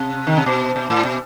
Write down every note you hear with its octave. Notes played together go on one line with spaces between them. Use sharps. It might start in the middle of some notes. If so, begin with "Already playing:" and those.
Already playing: C3
D#3
C3
B2
B2
A2
B2